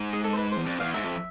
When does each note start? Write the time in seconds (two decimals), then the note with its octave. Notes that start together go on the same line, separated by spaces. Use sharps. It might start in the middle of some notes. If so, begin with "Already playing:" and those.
Already playing: G#2
0.13 G#4
0.24 A4
0.33 C5
0.37 B4
0.52 E2 C5
0.66 F2 D5
0.80 E2 F5
0.94 G#2 E5
1.04 F2